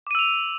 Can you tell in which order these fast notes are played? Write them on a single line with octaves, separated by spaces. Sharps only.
D6 D#7 E6 F7